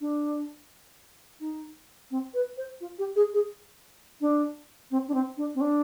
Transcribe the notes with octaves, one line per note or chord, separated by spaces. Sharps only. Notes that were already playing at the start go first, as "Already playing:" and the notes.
D4
D#4
C4
B4
C5
F4
G4
G#4
G#4
D4
C4
D4
C4
D4
C4
D4